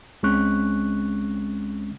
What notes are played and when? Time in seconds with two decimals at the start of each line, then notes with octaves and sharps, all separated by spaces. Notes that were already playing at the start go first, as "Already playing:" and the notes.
0.23 C#2 G#3 C4 C#4 C#6 F#6